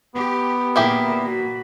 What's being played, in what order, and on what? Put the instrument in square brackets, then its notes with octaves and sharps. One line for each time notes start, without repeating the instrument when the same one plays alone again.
[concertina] B3 [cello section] G4
[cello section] A#2 A#3 [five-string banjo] E4 G4 G#4 [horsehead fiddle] A#4 E5
[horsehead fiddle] F#4 B5